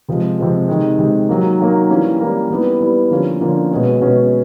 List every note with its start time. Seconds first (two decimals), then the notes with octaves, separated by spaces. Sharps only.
0.09 C3 F3 G#3
0.39 C3 F3 G#3
0.68 C3 D#3 G#3
0.99 C3 D#3 G#3
1.29 D#3 F#3 A#3
1.60 D#3 F#3 A#3
1.90 E3 G3 A#3 C#4
2.20 E3 G3 A#3 C#4
2.50 G3 B3 E4
2.81 G3 B3 E4
3.11 D3 F3 A#3 C#4 F4
3.41 D3 F3 A#3 C#4 F4
3.71 B2 G#3 C#4
4.01 B2 G#3 C#4